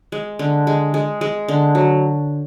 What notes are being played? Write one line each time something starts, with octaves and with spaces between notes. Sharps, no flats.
G#3
D3
G#3
G#3
G#3
D3
F#3